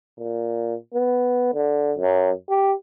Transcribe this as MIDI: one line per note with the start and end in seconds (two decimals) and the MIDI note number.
0.19 0.75 46
0.94 1.51 59
1.54 1.93 50
1.98 2.31 42
2.49 2.73 67